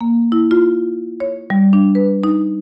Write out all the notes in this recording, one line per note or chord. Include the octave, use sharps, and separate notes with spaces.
A#3
E4
F4
C#5
G3
D4
B4
D#4